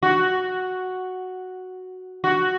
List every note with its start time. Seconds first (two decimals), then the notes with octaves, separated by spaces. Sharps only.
0.03 F#4
2.24 F#4